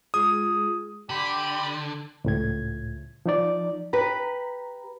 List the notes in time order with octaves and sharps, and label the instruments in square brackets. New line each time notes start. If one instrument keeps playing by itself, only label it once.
[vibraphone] G#3 F4 G#4 [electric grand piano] D#6
[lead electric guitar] D3 [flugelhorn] G4 [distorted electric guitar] B5
[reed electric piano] C#2 A2 G#6
F3 D#4 D5
[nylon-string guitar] G4 B4 [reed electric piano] A#5